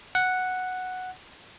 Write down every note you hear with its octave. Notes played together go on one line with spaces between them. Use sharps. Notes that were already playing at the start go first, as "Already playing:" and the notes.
F#5